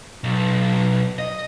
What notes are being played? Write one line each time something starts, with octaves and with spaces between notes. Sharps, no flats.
B1
D#5